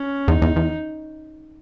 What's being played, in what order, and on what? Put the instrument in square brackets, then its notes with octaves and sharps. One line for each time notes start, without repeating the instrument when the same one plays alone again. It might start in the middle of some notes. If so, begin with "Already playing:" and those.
Already playing: [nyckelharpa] C#4
[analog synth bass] E2 [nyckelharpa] D#4
[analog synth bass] E2
E2